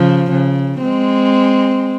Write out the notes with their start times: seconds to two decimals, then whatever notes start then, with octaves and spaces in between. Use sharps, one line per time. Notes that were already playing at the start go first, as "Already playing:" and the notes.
Already playing: C#3 F3
0.30 C#3
0.82 G#3 C4